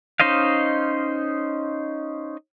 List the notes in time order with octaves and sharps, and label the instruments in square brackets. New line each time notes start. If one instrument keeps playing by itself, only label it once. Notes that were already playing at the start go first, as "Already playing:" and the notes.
[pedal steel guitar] C#4 D#4 C5 D#5 F5